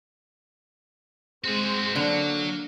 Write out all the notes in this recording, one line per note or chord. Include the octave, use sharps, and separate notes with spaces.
G#3 C4 F#4 G#4
D3 F#3 A#3